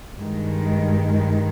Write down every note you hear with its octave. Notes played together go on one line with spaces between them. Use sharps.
G2 D#3 G#3